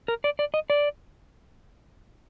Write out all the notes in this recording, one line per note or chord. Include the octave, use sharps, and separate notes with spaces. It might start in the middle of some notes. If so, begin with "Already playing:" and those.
A#4
D5
D5
D#5
D5